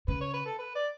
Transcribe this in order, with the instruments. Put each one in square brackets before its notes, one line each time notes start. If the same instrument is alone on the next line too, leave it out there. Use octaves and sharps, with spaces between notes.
[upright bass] C#3 [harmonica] B4
[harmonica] C#5
B4
A4
B4
D5